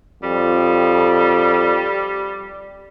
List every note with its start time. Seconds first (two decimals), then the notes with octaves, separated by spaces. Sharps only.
0.23 F2 G3